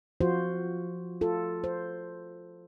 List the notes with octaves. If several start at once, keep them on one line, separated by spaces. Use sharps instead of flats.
F3 F4 F#4 C5
F4 A4
C5